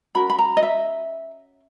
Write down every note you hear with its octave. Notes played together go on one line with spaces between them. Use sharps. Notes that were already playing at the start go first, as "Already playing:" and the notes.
C#4 F#4 A#4 B5
B5
A#5
D#5
E5